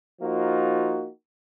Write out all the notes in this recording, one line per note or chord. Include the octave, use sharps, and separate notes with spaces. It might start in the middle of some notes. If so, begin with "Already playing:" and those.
F3 A#3 D#4 F4 F#4